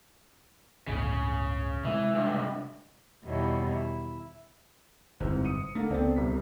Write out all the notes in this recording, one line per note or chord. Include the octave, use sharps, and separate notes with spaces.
G1 C#2 A2 C#3
C3 E3 G#3
C#2 G2
E2 B2 D#3 G3 E4 C#5
E4
G1 F2 G#2 C3 E3
D#6 C#7 D#7
D3 A3 A#3
C#2 B3 C4 D4 A4
D#1 C2 B6